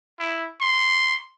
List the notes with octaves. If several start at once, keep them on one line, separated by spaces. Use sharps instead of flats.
E4
C6